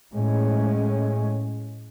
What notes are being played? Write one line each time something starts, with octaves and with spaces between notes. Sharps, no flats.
A2 G#3 C#4